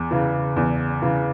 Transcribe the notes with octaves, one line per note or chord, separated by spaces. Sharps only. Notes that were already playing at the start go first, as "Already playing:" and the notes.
Already playing: E2
C#3 E3
E2
C#3 E3